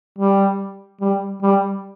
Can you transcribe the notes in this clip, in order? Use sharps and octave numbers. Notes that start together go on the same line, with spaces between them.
G3
G3
G3